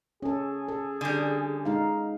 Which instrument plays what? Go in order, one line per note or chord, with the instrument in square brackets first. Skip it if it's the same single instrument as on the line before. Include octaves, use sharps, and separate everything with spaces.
[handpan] C#4 A4 [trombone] G#4
[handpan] A4
[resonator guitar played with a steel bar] D3 G3
[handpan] G#3 D#4 F5